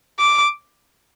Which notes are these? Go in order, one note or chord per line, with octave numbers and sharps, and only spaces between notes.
D6